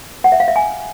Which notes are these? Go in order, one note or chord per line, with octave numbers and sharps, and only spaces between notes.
F#5
E5
F5
E5
G#5